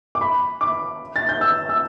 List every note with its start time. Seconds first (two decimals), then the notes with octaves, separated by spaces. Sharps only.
0.15 D6
0.21 B5
0.61 D6
1.16 A6
1.29 G6
1.41 E6
1.69 E6